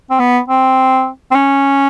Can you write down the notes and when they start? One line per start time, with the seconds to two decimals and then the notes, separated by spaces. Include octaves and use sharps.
0.10 C4
0.19 B3
0.48 C4
1.31 C4
1.35 C#4